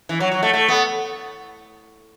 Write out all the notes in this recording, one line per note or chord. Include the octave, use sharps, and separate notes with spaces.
E3
F#3
F#3
A3
A3
B3